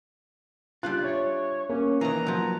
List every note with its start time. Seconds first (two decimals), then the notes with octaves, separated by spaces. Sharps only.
0.83 G3 D4 F4 F#6
1.03 C#5 E5
1.69 A#3 C#4
2.01 D#3 E3 A#5
2.26 F3 F#3